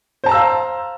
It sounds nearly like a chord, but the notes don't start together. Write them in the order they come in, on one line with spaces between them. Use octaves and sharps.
C5 A5 A#5 E6 F5